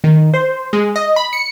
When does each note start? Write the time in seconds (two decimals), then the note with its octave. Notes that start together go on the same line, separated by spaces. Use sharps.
0.04 D#3
0.34 C5
0.73 G#3
0.96 D#5
1.16 B5
1.33 C#7